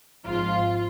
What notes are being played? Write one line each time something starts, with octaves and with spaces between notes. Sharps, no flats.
G#1 G#2 F3 F4